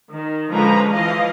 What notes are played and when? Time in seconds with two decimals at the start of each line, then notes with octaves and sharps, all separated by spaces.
0.11 D#3
0.53 D3 F3 G#3 C#4 B4 A#5
0.92 E3 F3 D#5 F5